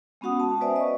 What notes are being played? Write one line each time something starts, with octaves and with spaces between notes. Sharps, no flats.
G#3 B3 C#4 F#4 F#5 D#6
A5
B4 C5 D5 E5 G#5
D#5 C#6